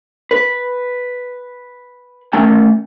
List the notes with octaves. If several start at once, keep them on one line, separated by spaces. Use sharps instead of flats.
B4
D#3 A3 C#4 G#5